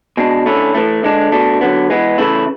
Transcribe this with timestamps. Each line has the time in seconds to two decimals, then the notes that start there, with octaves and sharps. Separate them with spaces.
0.17 B2 G#3 D4
0.46 D3 A3 C#4 E4
0.75 A2 E3 A3
1.03 D3 G#3 D4
1.32 B2 A3 D4
1.61 D3 F#3 B3
1.90 E3 G#3 B3
2.18 C#3 E3 A3 E4